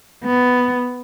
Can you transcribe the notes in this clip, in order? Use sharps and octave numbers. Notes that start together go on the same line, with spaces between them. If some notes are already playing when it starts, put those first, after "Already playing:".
B3